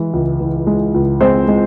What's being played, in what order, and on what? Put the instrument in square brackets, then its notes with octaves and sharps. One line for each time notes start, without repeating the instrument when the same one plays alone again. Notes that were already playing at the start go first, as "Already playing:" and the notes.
Already playing: [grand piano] E3 G#3
C#2
E3
G#3
C#2
G#3 C4 C5
G#3